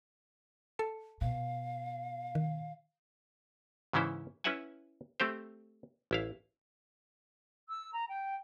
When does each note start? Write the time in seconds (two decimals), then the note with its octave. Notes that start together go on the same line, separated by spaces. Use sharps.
0.79 A4 A5 C#7
1.21 B2 F5
2.35 D#3
3.93 G#2 C#3 E3 C#4 E4 C5
4.44 C#4 E4 B4 E5 F#5 G#5
5.20 A3 C4 G4 C5
6.11 A1 E4 F5
7.70 E6
7.93 A#5
8.08 G5